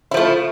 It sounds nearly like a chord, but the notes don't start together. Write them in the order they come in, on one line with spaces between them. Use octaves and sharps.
E4 F3 A3